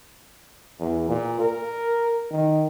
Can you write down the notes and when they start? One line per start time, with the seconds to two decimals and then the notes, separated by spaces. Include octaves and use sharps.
0.80 E2
1.09 A#2
1.40 A#4
2.32 D#3